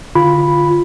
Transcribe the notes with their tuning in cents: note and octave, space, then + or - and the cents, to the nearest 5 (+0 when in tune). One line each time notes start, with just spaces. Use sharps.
D3 +0 F4 +0 B5 +0